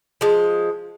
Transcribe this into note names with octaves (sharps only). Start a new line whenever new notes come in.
F3 G#3